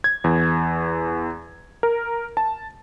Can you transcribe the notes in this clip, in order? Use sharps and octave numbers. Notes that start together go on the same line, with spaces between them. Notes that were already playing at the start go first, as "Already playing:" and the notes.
G#6
E2
A#4
A5